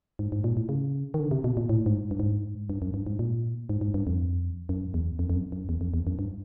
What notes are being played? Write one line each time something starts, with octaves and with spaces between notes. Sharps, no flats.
G#2
G#2
A#2
A2
C#3
D#3
D3
C3
B2
A#2
A2
G#2
G2
G#2
G2
F#2
G2
G#2
A#2
G#2
G#2
G2
F2
F#2
E2
F2
F2
F#2
F#2
E2
F2
E2
F#2
G2